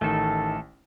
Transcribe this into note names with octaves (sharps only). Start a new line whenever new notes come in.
A1 D#3 A3 A4 A5